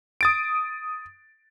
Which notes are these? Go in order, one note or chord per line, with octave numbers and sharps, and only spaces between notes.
D#6 A6 D7